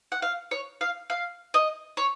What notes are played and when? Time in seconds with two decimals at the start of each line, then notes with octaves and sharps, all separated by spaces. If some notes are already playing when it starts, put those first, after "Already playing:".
0.12 F#5
0.22 F5
0.51 C#5
0.81 F5
1.10 F5
1.54 D#5
1.97 C#5